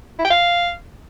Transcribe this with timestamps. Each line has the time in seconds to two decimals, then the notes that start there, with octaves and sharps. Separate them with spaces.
0.19 E4
0.25 G5
0.31 F5